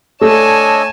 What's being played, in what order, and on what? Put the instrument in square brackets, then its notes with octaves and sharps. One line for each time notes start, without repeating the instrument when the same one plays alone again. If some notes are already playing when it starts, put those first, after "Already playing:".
[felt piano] A3 [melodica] D4 D#5 E6 [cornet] C#5 [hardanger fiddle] G#5 A5